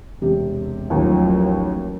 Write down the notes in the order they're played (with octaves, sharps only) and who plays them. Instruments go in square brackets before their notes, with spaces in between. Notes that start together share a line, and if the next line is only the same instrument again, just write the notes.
[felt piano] E1 C3 G4
[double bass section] A1 F#3 [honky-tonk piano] D#2 [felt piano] F3